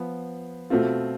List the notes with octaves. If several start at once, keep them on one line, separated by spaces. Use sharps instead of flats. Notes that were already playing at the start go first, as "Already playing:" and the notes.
Already playing: F3 B3
B2 A3 C4 F4